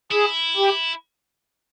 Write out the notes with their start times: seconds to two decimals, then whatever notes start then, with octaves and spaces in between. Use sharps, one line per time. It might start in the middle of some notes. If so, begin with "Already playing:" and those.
0.11 E4 G#4
0.56 G4